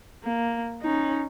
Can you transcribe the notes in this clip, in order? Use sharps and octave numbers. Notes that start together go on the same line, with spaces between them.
A#3
C#4 D#4